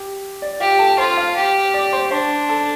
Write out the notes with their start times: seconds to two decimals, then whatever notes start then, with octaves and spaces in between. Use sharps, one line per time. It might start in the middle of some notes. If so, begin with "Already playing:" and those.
Already playing: G4
0.42 D5
0.60 F4 G4 F5
0.79 A4 A5
0.98 F4 C5 C6
1.17 F5 F6
1.36 G4
1.74 D5 D6
1.93 C5 C6
2.11 D4 C5 C6
2.49 A4 A5